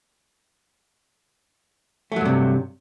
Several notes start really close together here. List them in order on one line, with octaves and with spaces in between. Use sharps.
A3 F#3 G2 C3